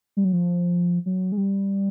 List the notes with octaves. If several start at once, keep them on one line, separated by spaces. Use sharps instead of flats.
G3
F#3
F3
F#3
G#3
G3